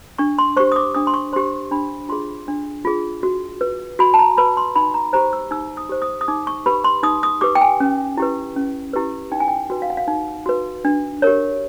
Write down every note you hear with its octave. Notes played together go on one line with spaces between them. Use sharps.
D4 C#6
C6
G4 C5 C#6
D#6
D6
D4 D#6
C6
C#6
G4 C5 C6
D4 B5
F4 G#4 C6
D4
F4 G#4
F#4
B4
F#4 B5
A5
A#5
B4 B5
C6
D#4 B5
A#5
G4 C5 A#5
E6
D#4 E6
D#6
G4 C5
D#6
D#6
D#4 D6
C#6
G4 B4 B5
C6
D#4 D#6
D#6
G4 B4 D6
G5
G#5
C#4
E4 G4 B4
C#4
E4 G4 B4
D#4 G5
G#5
G5
F#4 B4
F5
F#5
F5
D#4
F#4 B4
D4
G4 A#4 C#5